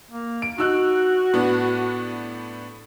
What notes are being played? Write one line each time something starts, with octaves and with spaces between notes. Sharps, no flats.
A#3
D7
D#4 F#4 E6 F#6
A2 B3 D4